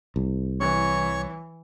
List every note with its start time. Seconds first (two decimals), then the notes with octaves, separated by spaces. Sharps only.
0.16 C2
0.60 E3 C#5 C#6